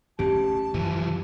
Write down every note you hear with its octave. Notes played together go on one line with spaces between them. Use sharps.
A1 E2 C#4 G4 A5
F#2 C3 E3 F3